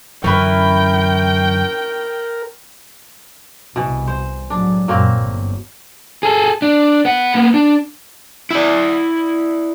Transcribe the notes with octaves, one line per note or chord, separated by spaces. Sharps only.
F#2 D3 E3 C#4 E4 A#4 B4 G5
C2 B2 E3
C5
A2 F#3 G#3 D4
F#2 A#2 F#3 A#3 C4
G1 E2
G#4 A4
D4
B3 F#5
A#3 B3
D4
E4 D5